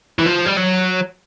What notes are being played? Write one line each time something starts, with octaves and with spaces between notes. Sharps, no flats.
E3
F3
G3
F#3